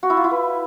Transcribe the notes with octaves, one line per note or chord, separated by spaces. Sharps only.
F#4
E4
F4
E4
B4